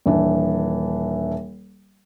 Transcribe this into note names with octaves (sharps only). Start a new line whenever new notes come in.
D#1 E3 D4